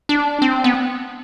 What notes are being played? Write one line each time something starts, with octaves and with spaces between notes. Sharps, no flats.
D4
C4
B3